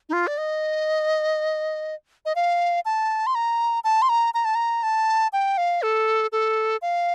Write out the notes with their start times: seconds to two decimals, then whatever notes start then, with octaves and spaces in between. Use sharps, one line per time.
0.09 D#4
0.13 F4
0.27 D5
0.38 D#5
2.26 D#5
2.36 F5
2.85 A5
3.27 C6
3.35 A#5
3.84 A5
4.02 C6
4.09 A#5
4.34 A#5
4.45 A5
4.55 A#5
4.83 A5
5.33 G5
5.58 F5
5.82 A4
6.32 A4
6.82 F5